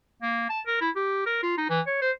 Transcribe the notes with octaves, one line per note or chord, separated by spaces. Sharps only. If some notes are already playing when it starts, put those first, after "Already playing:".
A#3
A5
A#4
E4
G4
A#4
F4
D#4
E3
C#5
C5